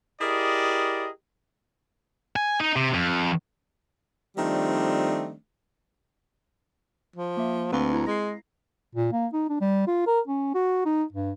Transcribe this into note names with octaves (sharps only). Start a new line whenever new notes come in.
E4 G4 G#4 A#4 D5 D#5
G#5
D#4
C3
F2
D#3 F3 G3 A3 C4 D4
F3
A#3 E5
D2 C4 B4 F5
E4 A#5
G#3 A#6 C7
A#2
A#3
D#4
D4
G3
F4
A#4
C#4
F#4
D#4
G2